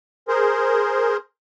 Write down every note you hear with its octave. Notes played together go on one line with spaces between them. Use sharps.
G#4 A#4 C5